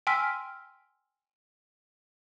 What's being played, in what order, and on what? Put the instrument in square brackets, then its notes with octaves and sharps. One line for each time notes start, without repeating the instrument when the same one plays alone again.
[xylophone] G5 G#5 C6 E6 F6 B6